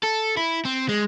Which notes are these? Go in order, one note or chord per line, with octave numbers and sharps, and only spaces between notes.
A4
E4
C4
G#3